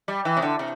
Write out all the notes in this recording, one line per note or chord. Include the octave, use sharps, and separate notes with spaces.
G3
E3
C3
D3
C3